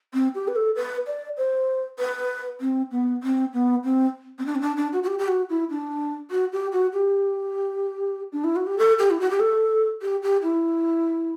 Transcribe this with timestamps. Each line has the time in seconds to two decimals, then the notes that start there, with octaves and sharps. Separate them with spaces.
0.14 C4
0.35 G4
0.48 B4
0.56 A4
0.75 B4
1.07 D5
1.37 C5
1.99 B4
2.61 C4
2.91 B3
3.23 C4
3.54 B3
3.84 C4
4.39 C4
4.46 D4
4.55 C4
4.61 D4
4.77 D4
4.93 F#4
5.03 F#4
5.07 G4
5.19 G4
5.28 F#4
5.50 E4
5.70 D4
6.31 F#4
6.52 G4
6.72 F#4
6.93 G4
8.32 D4
8.44 E4
8.56 F#4
8.67 G4
8.78 A4
8.99 G4
9.11 E4
9.20 F#4
9.30 G4
9.40 A4
10.02 G4
10.23 G4
10.43 E4